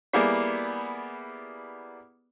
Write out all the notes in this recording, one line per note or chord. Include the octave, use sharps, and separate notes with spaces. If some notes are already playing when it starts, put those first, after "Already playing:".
G3 A#3 B3 E4 G#4 D5